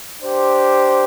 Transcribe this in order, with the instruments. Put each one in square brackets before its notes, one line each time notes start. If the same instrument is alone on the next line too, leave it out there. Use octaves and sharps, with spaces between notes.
[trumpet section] D4 G4 C5